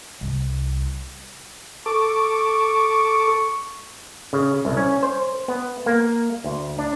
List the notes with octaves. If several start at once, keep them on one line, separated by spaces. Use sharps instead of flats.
C2
A4 C#6 D6
C#3
C2
C#4
C5
B3
A#3
D2
D4